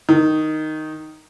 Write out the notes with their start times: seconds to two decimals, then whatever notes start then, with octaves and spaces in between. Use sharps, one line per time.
0.09 D#3